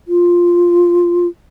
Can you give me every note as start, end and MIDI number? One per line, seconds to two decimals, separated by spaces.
0.08 1.27 65